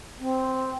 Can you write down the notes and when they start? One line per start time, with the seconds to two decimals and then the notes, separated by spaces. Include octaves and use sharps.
0.19 C4